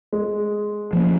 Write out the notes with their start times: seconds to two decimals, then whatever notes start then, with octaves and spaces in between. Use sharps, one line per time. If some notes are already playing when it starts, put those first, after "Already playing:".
0.13 G#3
0.93 F3 A#3 C#4